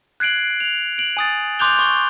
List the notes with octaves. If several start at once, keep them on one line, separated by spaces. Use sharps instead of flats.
F#6 G#6 C7 D7 F#7
F7
D7 F#7
G#5 D#6 A6
C6 D6 F#6 G6 F7 G7
C#6 G7